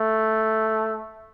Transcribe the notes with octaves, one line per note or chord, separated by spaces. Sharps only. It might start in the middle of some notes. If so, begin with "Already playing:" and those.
Already playing: A3